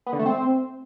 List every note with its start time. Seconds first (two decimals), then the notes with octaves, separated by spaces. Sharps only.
0.06 B3
0.13 D3
0.19 A3
0.26 C4